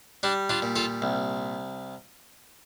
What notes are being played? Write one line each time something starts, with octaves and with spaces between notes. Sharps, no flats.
G3 D4
D4 F4
A#2
F4 A4
C2